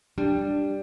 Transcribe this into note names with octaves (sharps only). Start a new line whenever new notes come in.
G3 D4